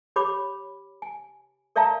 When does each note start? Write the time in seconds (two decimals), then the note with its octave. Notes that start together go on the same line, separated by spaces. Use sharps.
0.16 G4 C#5 B5 D6
1.02 G#5
1.76 A#4 D5 E5 F5 A5 A#5